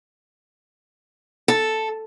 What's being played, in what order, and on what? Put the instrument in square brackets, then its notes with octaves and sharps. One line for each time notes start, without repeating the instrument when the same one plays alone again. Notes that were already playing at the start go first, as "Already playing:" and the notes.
[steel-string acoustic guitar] A4